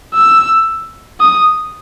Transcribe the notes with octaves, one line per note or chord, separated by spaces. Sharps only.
E6
D#6